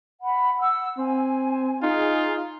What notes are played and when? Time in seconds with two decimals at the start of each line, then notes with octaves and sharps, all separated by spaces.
0.22 F#5 B5
0.59 F#5 E6
0.98 C4 G#5
1.83 D#4 F4 G#4